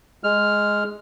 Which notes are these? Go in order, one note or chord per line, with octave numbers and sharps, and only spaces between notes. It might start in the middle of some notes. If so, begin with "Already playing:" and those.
G#3 F6